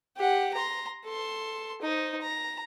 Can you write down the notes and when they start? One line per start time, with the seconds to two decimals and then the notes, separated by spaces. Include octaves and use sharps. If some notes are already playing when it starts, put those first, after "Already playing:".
0.17 G4 F#5
0.54 A#5 C6
1.05 A4 C6
1.82 D#4 C5
2.21 A#5